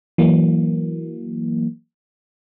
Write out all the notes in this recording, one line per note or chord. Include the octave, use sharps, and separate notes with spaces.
E3 F#3 A#3